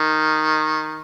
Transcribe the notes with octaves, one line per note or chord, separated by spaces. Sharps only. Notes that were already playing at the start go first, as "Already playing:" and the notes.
Already playing: D#3